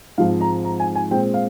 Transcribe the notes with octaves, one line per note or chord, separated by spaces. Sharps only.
G#2 F3 G#3 C4 F5
A#5
A#5
G#5
G#5
A#2 G#3 C4 G5
F5